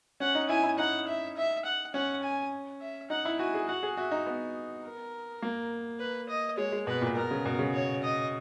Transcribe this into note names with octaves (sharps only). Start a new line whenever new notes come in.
C#4 F#5
D#4
E4 G#5
E4
D#4 F#5
E5
E5
F#5
C#4 F#5
G#5
E5
D#4 F#5
E4
F#4 G#5
G#4
F#4 F#5
G#4
F#4 E5
D#4
B3
A#4
A#3
B4
D#5
G#3 C#5
G#3
B2 B4
A#2
B2 A#4
C#3
B2
C#3
C#5
D#5